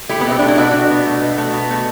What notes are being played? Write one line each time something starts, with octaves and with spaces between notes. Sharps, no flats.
A3 E4 G4
B3
B2 C4
A3 D4
E4
B2 D4 F#4
A3
B2
A3
B2
A3
B2
A3